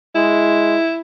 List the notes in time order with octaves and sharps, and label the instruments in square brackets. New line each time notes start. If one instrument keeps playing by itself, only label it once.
[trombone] G#3 [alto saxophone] E4